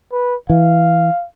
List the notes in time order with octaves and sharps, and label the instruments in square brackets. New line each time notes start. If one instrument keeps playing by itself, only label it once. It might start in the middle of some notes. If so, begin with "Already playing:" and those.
[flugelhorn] B4
[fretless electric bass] E3 [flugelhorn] F5